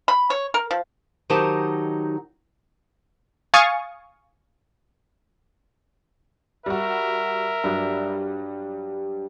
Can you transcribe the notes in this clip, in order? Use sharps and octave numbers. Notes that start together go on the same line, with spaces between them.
B5
C#5
A#4
F3
D#3 F#3 D#4 G4 C5 A5
F5 G#5 C#6 D#6 A6
G3 F#4 A#4 E5
G2 F#3 G3